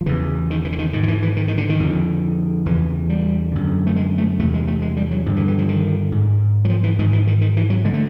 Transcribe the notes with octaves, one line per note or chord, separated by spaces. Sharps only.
F3
E2 C#3 E3
D#3
E3
D3
D#3
G#2 D#3
D#3
E3
E3
D#3
D#3
D3
D#3
F2 D3
E2 C#3 E3
G3
F#2 D3
A3
G#3
A3
E2 C3 A3
G#3
A3
G#3
G3
F#3
G2 D3 F3
E3
E3
F3
D#3
G#2
F#3
F3
E3
G#2 D#3
E3
D#3
D#3
E3
F#3
D3 G#3
A3